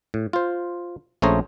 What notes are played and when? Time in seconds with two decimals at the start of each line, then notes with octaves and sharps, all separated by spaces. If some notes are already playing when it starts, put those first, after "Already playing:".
0.14 A2
0.33 F4 C5
1.22 A#1 A3 C#4 G#4 C5 A#5